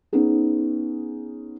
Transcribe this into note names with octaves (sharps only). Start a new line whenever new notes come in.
B3 C#4 D#4 G#4